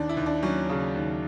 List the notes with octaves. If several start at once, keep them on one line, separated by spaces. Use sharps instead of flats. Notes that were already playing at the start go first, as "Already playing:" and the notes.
Already playing: D#2 D4
E4
D#2
D4
F#3 C#4
C#3
D#2